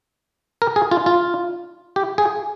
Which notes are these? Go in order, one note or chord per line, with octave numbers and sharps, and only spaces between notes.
A#4
G#4
F4
F4
G4
G#4